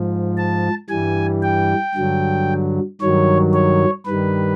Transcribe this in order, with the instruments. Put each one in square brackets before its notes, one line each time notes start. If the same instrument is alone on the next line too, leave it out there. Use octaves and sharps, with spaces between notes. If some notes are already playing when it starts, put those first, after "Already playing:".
Already playing: [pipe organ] G#2 F3
A5
G2 E3 G3 G#5
G5
G2 D3 F#3
G2 D#3 F#3 C#5
C#5
G2 D#3 G3 B4